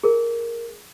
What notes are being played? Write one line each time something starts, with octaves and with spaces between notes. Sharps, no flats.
G#4 A#4